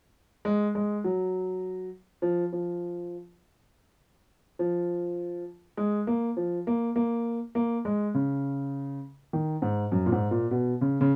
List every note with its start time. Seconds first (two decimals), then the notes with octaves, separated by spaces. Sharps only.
0.45 G#3
0.75 G#3
1.04 F#3
2.22 F3
2.53 F3
4.59 F3
5.77 G#3
6.07 A#3
6.37 F3
6.67 A#3
6.96 A#3
7.55 A#3
7.85 G#3
8.14 C#3
9.33 D#3
9.62 G#2
9.92 F#2
10.06 A#2
10.12 G#2
10.31 A#2
10.51 B2
10.81 C#3
11.01 C#3